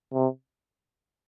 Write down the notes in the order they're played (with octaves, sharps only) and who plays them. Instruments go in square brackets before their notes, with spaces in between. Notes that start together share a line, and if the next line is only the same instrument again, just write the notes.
[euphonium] C3